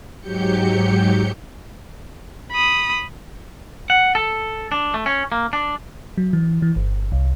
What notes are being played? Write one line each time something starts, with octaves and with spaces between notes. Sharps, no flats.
G#2 F#3 G4 G6 C#7
B5 D#6
F#5
A4
D4
A3
C#4
A#3
D4
F#3
E3
E3
G1
C2